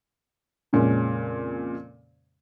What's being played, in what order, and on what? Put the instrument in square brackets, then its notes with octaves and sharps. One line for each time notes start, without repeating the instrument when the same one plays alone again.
[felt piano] F2 A#2 C#3 G#3 C#4